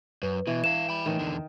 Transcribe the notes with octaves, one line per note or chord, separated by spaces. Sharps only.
F#2 B4
B2 E3
B4 F5 E7
G5 B5
A2 D#3 E3
E2 D3